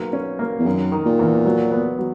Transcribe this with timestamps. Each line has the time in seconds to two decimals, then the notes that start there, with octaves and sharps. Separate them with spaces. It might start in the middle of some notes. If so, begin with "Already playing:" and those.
Already playing: B1 A#3
0.13 C#4
0.39 A#3
0.59 E2
0.66 F#2 D#3
0.92 D#3
1.06 A#2
1.19 E2
1.46 F#3
1.72 B3
1.99 F#3